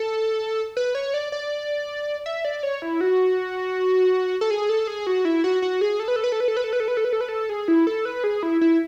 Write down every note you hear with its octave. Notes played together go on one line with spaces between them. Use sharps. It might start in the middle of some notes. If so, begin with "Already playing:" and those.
Already playing: A4
B4
C#5
D5
D5
E5
D5
C#5
E4
F#4
A4
G#4
A4
G#4
F#4
E4
F#4
F#4
G#4
A4
B4
A4
B4
A4
B4
A4
B4
A4
B4
A4
B4
A4
B4
A4
B4
A4
G#4
E4
A4
B4
G#4
E4
E4